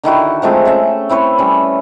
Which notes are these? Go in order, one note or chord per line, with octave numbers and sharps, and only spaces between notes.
D3 D#3 E4 F#4
F3 G#3 A3 C4
A3 C#4 E5
C4 E4 B4 C#5
G3 C#4